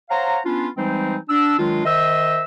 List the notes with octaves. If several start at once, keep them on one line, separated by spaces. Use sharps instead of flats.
C5 C#5 F5 F#5 A#5
B3 C#4 D4 F4
E3 G3 G#3 C4 D#4 C5
D4 E6
D#3 F#3 G#3 D4 F4
D#3 C5 D#5 E5 E6